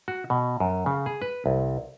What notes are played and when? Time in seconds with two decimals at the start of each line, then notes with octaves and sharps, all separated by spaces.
0.08 F#4
0.30 B2
0.60 F#2
0.86 C#3
1.06 G#4
1.22 B4
1.46 C2